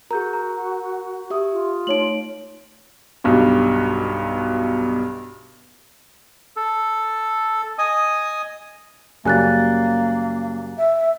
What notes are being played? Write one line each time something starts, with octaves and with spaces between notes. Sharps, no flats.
F#4 G#4 A#4 A#5 G6
A#5
G4 E5 D#6
F4
A3 D#4 C#5 D7 F#7
B1 G2 B2
A4
D#5 G#5 D#6
F#2 C#3 G3 A#3 G#5 F#6 A6
E5